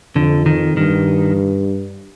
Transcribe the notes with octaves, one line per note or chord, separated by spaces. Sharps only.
F2 D3
D#3
G2 D#3